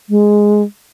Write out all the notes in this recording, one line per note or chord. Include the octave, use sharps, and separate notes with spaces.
G#3